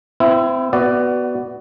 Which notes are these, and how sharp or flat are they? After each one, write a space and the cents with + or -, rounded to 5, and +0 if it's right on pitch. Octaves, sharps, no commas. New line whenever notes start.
C4 -25 E4 +20
B3 +0 F#4 +20 D5 +0